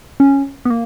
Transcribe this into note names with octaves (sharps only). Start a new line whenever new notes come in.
C#4
B3
A#3